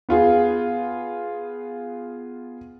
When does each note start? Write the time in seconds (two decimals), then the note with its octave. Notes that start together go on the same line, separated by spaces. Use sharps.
0.09 B3 F4 G#4